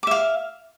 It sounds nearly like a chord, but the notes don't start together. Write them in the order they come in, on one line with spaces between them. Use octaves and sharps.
D6 E5 F5